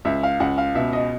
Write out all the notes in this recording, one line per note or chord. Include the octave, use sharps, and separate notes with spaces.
C#2 E5
F5
C#2 F#5
F5
B2 E5
D#5